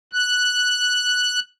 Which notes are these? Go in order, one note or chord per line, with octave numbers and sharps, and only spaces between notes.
F#6